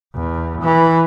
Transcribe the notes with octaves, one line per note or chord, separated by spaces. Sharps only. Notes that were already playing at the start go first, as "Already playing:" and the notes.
E2
E3